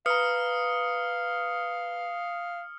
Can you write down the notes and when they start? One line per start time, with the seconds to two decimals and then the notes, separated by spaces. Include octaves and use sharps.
0.06 B4 F5 A#5 D#6 F6 C#7